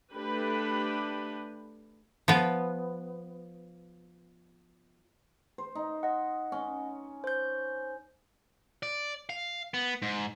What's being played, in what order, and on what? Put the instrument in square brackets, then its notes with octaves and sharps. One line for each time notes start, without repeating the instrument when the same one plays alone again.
[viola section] A3 D4 G4 B4
[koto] F3 B3
[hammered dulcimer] C5
D#4
[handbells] D#5 F#5
[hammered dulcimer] C#4
[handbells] C5 G6
[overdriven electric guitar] D5
F5
B3
G#2